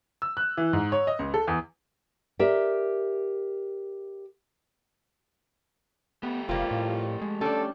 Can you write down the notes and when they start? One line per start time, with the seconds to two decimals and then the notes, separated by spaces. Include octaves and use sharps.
0.22 E6
0.37 F#6
0.57 E3
0.73 G#2
0.92 C#5
1.07 D#5
1.19 C#2
1.34 A4
1.47 E2
2.39 G4 A#4 D5 E5
6.23 A3 B3 G4
6.49 F1 G3 A#3 C4 F4
6.71 A2
7.21 G#3
7.41 G3 C#4 D4 A4